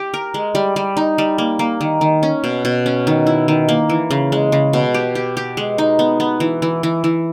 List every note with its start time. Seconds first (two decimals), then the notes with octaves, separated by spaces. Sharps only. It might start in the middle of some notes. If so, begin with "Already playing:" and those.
Already playing: G4
0.14 A#4
0.34 G#3
0.55 G3
0.76 G3
0.97 D#4
1.18 G3
1.38 A#3
1.59 A#3
1.81 D#3
2.01 D#3
2.23 C#4
2.44 B2
2.65 B2
2.86 C#4
3.07 D#3
3.27 E4
3.48 D#3
3.69 A#3
3.90 E3
4.11 C#3
4.32 G#3
4.52 C#3
4.73 B2
4.94 G4
5.15 G4
5.37 G4
5.57 G#3
5.78 D#4
5.99 B3
6.20 B3
6.40 E3
6.62 E3
6.83 E3
7.04 E3